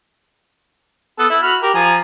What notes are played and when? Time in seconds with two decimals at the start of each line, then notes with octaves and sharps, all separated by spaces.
1.19 B3 A4
1.30 E4
1.43 F#4 B5 F6
1.62 G4 A#4
1.74 F3 G#5 A#5